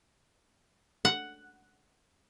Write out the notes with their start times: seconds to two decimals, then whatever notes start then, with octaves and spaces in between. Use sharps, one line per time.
1.05 F#5